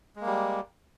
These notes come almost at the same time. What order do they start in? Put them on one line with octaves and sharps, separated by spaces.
G#3 A#3 G3